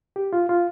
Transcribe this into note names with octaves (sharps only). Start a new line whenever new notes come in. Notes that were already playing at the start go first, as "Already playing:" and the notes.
G4
F4
F4